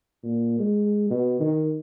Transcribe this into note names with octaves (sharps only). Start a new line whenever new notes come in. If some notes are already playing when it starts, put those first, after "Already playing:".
A#2
G#3
B2
D#3